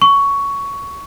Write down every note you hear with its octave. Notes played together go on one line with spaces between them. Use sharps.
C#6